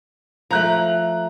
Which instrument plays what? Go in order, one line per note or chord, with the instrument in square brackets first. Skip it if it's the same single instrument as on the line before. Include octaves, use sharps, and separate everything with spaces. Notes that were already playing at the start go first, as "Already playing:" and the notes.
[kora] F3 A3 [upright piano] A#5 F#6